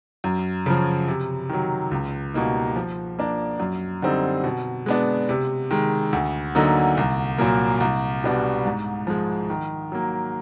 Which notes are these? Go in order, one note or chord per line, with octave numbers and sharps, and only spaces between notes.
F#2
C#3 F3
C3
D#3 F#3
C#2
B2 G3 A#3 D#4
F3
A#3 D4
F#2
D3 G3 C4 D#4
B2
G#3 B3 D4
C3
D#3 G#3
D2
D3 F#3 A#3 D#4
C2
A#2 F#3 A#3
C2
B2 G3 B3 D4
G#2
F3 G#3
D#3
F#3 A#3